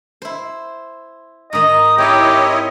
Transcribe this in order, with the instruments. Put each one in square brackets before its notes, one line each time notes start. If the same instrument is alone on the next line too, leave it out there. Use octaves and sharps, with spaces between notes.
[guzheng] E4 C5
[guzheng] G#2 D#3 [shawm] D#5
[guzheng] C4 A#4 F5 [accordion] E4 C#5 D#5 [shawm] G4